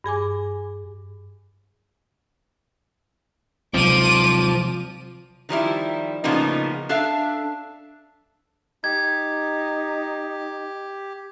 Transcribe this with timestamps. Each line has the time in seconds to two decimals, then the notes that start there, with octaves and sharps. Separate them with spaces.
0.04 G2 G#4 G#5 D6
3.74 C3 F3 F#3 C4 D6 D#7
5.49 D#3 F3 G3 E4
6.24 A2 C#3 F3 A#3 B3 D#4
6.89 D4 A4 E5 F5
8.84 D#4 G4 G#6